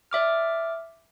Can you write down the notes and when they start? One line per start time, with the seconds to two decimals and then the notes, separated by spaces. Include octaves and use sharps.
0.11 D5 E5 D6 F6